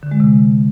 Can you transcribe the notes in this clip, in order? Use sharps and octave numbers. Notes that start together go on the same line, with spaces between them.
D3
G#3
C3